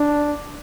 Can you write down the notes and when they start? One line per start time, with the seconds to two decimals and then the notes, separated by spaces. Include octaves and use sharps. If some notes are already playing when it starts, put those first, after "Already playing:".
Already playing: D4